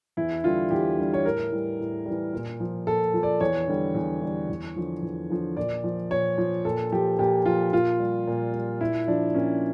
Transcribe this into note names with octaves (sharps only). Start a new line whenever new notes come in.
E2 E4
D3 G3 F4
E2 G4
D3 G3
C#5
A2 A#4
E3 G3
A2
E3 G3
A#2
F3
A#2 A4
F3
D5
E2 C#5
D3 G3
E2
D3 G3
E2
D3 F3
E2
D3 F3
A#2 D5
F3
A#2 C#5
F3
A#2 A4
F3 G4
A#2 G4
F3 F4
A#2 F4
G3
A#2
G3
A#2 E4
F3 D4
A#2 C#4